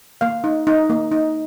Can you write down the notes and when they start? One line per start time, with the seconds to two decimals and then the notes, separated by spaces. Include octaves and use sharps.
0.21 A#3 F5
0.44 D#4
0.67 D#4
0.90 A#3
1.12 D#4